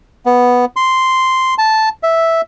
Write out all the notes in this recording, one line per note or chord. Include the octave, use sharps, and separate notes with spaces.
B3
C6
A5
E5